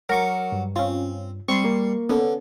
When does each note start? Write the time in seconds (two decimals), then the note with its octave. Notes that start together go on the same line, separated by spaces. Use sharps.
0.09 F#3 A#4 C#6 D6
0.52 G2
0.76 C4 C#4 F4
1.49 G3 C4 C6 C#6
1.64 A#3 A#4
2.09 D3 B3 C#4 A4